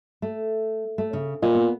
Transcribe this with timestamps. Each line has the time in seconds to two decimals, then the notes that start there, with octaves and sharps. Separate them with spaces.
0.22 A3
0.98 A3
1.13 C#3
1.42 A#2 B4 C5 D#5
1.55 B3